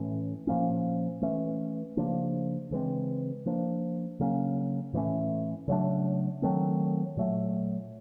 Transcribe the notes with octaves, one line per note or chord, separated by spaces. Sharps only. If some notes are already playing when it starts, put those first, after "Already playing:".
Already playing: A2 E3 A3 C#4
A#2 F3 A#3 C#4
E3 A3 C#4
C#3 F3 A#3 D4
C#3 E3 G#3 C4
F3 A#3 D4
C#3 F#3 A#3 C#4
A2 E3 A3 C#4
C#3 F#3 A3 D4
D#3 F#3 A3 C4
A#2 F#3 A3